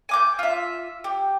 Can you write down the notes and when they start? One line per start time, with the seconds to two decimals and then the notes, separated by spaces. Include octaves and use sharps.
0.09 G#5 D6 G6
0.39 F4 E5
1.04 G4